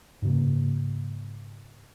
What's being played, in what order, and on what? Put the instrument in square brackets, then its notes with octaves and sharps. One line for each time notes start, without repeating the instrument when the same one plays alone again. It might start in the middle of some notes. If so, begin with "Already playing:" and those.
[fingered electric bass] G#2 C#3 A#3